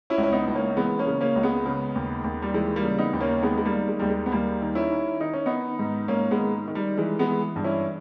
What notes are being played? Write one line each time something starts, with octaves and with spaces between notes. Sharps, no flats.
C#4 E4
C#2
C#4
B3 D#4
C#2
A#3 C#4
E3 G#3 B3
A#3 C#4
C#3
A#3 C#4
C#2
G#3 B3
C#3
D#2
D#2
G3
E3 G#3
G3 A#3
C#3
B3 D#4
D#2
A#3 C#4
D#3 G#3 B3
G#3
G3 A#3
D#3
G#3
D#2 G3
G#3
B3
D#2 G3 A#3
D#3
C#4 E4
D#3
D#3 D#4
C#4
D#3 B3 D#4
G#2
G#2 A#3 C#4
G#3 B3
D#3
D#3
G3
E3 G#3
G#3 B3
E3
G2
C#4 E4